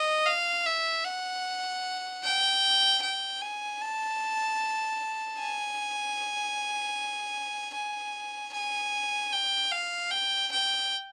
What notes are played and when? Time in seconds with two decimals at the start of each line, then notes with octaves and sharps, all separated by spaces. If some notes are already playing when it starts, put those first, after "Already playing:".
Already playing: D#5
0.27 F5
0.66 E5
1.05 F#5
2.23 G5
3.02 G5
3.41 G#5
3.81 A5
5.39 G#5
7.75 G#5
8.53 G#5
9.33 G5
9.71 F5
10.11 G5
10.51 G5